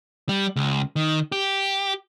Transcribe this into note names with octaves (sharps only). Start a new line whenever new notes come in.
G3
C#2
D#3
G4